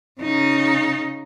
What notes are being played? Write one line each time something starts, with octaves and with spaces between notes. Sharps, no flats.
C#3 D#4